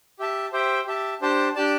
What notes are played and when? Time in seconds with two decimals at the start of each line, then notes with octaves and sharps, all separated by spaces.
0.20 G4 E5 A5
0.52 G4 C5 E5 G5
0.86 G4 E5 A5
1.22 D4 G4 C5 A5
1.55 D4 G4 D5 A5